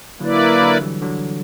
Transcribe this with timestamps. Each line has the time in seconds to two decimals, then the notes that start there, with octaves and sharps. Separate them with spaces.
0.20 D3 F#3 A#3 E4 B4 D5
0.62 D3 F#3
0.81 E3 G3
1.02 D3 F#3